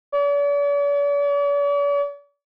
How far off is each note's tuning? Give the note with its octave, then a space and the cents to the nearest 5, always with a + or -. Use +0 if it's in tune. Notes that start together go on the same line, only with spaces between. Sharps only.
D5 -45